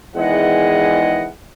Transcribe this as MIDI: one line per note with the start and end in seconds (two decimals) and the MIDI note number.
0.16 1.28 40
0.16 1.28 51
0.16 1.28 52
0.16 1.28 56
0.16 1.28 75
0.16 1.28 78